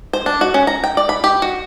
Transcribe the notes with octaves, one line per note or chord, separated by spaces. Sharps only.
C5
D4
F#4
C#4
A#5
G5
D5
B5
G4
F#4